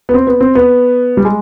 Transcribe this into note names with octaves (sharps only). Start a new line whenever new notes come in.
B3
C4
B3
C4
B3
G3
G#3